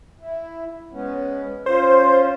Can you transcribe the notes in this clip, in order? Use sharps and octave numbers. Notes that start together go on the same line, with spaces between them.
E4
G#3 B3 C#4
C#4 F4 C5